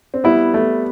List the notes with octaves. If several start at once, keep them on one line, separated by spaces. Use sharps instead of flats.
C4
G3 B3 E4
A3